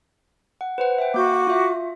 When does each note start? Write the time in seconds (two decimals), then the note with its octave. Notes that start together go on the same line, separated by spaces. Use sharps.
0.61 F#5
0.78 B4 C5 F#5
0.98 E5 G5
1.14 A#3 F#4 D6 G6
1.47 F4 E5